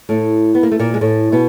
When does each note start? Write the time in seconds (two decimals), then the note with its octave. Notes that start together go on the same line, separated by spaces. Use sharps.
0.09 A2 A3
0.55 B3
0.63 A#3
0.72 A3
0.79 A#2 A#3
0.94 G#3
1.01 A2 A3
1.32 B2 B3